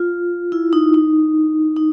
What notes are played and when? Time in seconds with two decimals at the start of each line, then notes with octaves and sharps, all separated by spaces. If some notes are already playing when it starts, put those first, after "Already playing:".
Already playing: F4
0.52 E4
0.73 D#4
0.94 D#4
1.76 D#4